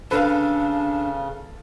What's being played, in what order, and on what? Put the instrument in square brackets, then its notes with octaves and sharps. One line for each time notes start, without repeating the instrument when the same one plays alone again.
[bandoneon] C#3 [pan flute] D4 [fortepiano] A4 F5 [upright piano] B4